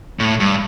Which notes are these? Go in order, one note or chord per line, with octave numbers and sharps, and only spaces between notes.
A2
G2